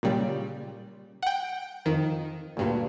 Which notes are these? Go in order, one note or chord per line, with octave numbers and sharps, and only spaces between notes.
A#2 C#3 G3
F#5 G5
F2 D#3
D2 G2 A#2